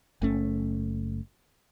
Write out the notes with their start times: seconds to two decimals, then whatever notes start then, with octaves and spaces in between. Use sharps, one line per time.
0.22 F#1 A3 C#4